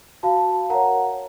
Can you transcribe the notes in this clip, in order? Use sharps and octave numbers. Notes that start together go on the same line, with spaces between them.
F#4 F5 A5
A#4 C#5 F#5 A#5